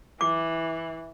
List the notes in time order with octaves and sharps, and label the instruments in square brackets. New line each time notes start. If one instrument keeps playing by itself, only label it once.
[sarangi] E3 [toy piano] D6